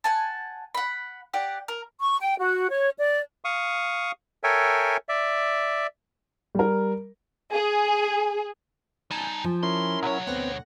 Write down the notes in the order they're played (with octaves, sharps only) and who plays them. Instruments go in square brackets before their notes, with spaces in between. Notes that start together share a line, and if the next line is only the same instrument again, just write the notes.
[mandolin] F#5 G#5 A5
F#5 B5
G4 D5 F#5
A#4
[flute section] C#6
G5
F#4
C#5
D5
[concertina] F5 C#6 D#6
A4 A#4 C#5 E5 G5 G#5
D5 E5
[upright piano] G3 A#4
[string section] G#4
[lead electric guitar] G3 D#4 [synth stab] G#5 A5 G6
[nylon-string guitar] F3
[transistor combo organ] C#4 E4 A#4 [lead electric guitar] C6
[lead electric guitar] B1 C#5 [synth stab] F#3
[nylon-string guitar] D2 [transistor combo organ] B3 C4 [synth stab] F#5 A#6